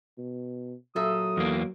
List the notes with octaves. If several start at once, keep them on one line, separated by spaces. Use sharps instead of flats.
B2
A#2 F#3 A4 E5 D#6
E2 A#3